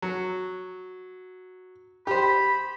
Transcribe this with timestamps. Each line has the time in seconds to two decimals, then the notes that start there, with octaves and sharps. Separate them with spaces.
0.02 F#3
2.07 G4 C5 B5